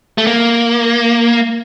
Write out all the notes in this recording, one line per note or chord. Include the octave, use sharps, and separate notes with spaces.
A3
A#3